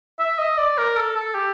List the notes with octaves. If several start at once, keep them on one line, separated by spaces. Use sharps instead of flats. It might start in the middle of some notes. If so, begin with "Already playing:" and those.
E5
D#5
D5
A#4
A4
A4
G4